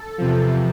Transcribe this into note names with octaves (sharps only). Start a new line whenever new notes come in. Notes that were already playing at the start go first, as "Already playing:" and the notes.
Already playing: A4
E2 C3 F3